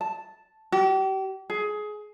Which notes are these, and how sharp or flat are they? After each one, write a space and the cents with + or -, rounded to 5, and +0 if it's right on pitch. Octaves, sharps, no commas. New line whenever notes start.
A5 -5
G4 -35
G#4 +20